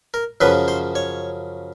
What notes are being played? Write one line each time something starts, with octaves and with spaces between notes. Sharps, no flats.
A#4
F#2 C#3 F3 B4
C5
C#5